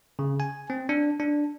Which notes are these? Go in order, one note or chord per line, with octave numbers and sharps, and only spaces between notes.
C#3
G#5
C4
D4
D4